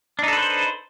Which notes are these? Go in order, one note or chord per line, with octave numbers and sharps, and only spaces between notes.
D4 D#4 A4 B4 C5